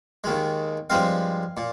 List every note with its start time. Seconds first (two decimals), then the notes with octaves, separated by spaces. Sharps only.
0.24 D#2 D#3 G#3
0.90 G2 F3 G#3 C4 F5
1.57 A#2